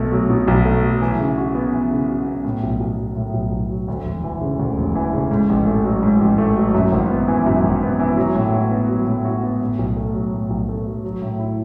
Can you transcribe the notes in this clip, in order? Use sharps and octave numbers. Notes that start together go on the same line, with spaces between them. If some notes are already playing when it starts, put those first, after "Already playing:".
Already playing: B1 B2 A3
F#3
B2
B1
A3
F#3
E3
C#3
F#4
B3
E3
C#3
F#4
B3
A2
B1
B1
F#3
A2
B1
B1
F#3
D2
E1
E3
C#3
D2
E1
E3
C#3
G#2
A1
A3
F#3
G#2
A1
A3
F#3
F#2
G#1
B3
E3
F#2
G#1
B3
E3
F#3
A2
F#4
B3
F#3
A2
F#4
B3
A2
B1
A3
F#3
A2
B1
A3
F#3
F#3
A2
E4